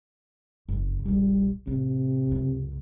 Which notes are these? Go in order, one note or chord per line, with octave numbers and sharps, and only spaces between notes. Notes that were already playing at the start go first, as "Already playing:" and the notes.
F#1 F2
D#1 A#1 G3
A1 C3
C#2 F#2